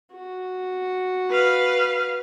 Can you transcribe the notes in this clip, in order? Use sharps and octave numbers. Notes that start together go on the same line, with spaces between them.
F#4
B4 F5